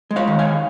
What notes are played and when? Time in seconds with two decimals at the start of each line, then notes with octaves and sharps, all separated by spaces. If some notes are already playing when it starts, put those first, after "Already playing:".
0.11 G#3
0.16 C#5 F5
0.27 D#3
0.39 F5 G#5
0.45 D#3